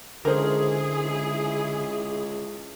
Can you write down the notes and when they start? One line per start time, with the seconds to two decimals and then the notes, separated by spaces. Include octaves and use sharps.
0.25 C#2 D3 E4 G#4 A#4 C5
1.03 C#2